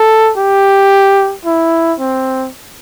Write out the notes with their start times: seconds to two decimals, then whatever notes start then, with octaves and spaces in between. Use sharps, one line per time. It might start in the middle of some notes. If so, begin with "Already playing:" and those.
Already playing: A4
0.37 G4
1.45 E4
2.00 C4